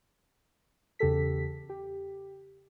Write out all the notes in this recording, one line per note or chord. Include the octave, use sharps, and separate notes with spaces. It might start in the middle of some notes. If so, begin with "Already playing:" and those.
E2 C#3 G4 A4 B6
G4